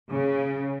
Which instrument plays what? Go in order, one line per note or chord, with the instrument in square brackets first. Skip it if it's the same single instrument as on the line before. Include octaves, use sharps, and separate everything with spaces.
[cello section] C#3